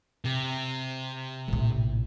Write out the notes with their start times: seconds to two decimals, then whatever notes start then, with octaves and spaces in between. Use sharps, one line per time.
0.25 C3
1.48 A#1 A2